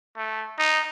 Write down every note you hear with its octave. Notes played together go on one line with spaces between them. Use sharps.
A3
D#4